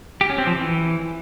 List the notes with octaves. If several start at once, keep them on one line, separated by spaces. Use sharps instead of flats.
G4
C#4
C4
F3
E3